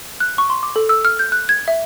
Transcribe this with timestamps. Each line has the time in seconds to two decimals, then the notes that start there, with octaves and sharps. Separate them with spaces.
0.20 F#6
0.38 C#6
0.50 C6
0.63 D6
0.76 A4
0.89 E6
1.05 F6
1.19 G6
1.32 F#6
1.49 G#6
1.68 E5